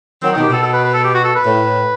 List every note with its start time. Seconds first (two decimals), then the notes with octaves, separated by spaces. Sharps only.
0.22 D#3 F#3 C4
0.32 D#4
0.36 B2 D#3
0.42 G4
0.49 B2 A4
0.63 A4
0.74 B4
0.84 B4
0.94 A4
1.04 G4
1.14 F#4
1.24 A4
1.35 B4
1.45 A2